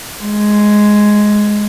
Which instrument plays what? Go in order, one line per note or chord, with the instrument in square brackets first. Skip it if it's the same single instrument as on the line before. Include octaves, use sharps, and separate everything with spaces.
[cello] G#3